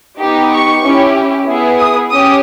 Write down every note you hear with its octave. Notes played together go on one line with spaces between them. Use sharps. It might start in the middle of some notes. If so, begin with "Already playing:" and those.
B3 D#4 G4
C#6
C#4 E4 G4
B3 E4 G#4
D#6
C#4 G4 D#6